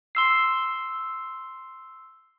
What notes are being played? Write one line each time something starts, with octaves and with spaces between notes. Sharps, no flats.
C6 E6 C7